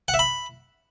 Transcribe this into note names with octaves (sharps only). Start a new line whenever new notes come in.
F#5
E5
B5